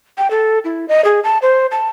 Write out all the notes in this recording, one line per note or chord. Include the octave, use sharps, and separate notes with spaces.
G5
A4
E4
D#5
G#4
A5
C5
A5